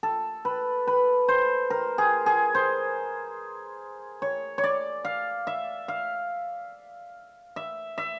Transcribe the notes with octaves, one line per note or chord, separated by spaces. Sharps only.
A4
B4
B4
C5
A#4
G#4
G#4
C5
C#5
C#5
D5
F5
E5
F5
E5
E5